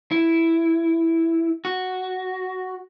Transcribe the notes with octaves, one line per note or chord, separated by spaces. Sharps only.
E4
F#4